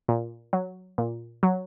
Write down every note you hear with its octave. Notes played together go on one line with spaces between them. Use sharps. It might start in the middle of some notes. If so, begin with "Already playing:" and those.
A#2
F#3
A#2
F#3